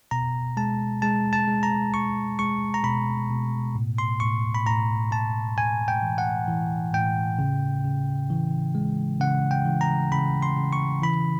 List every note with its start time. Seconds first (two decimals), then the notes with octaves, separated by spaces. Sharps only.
0.11 B2 A#5
0.57 G#3 A5
1.02 G#3 A5
1.33 A5
1.48 G#3
1.63 A#5
1.94 G#3 C#6
2.39 G#3 C#6
2.74 A#5
2.84 B2 B5
3.30 B2
3.75 A2
3.98 C6
4.20 A2 C#6
4.54 B5
4.66 A2 A#5
5.11 A2 A5
5.57 A2 G#5
5.88 G5
6.02 E3
6.18 F#5
6.48 E3
6.94 A2 G5
7.39 C#3
7.84 C#3
8.30 E3
8.75 G#3
9.20 C#3 F#5
9.51 G5
9.66 E3
9.81 A#5
10.12 C#3 B5
10.42 C6
10.57 C#3
10.73 C#6
11.02 E3 B5